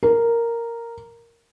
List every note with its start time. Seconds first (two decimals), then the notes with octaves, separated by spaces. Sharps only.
0.03 A#4